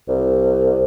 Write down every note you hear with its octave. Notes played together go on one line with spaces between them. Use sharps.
C2